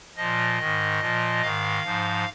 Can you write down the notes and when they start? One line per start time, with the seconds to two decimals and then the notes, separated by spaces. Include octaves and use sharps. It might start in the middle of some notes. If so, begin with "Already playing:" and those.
0.17 A#2 F3 D#5
0.58 G#2 D#3
1.00 A#2 F3
1.42 G#2 D#3 F5
1.83 G#2 F3